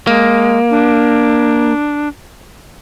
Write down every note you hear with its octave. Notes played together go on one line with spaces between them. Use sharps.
G#3 A#3
D4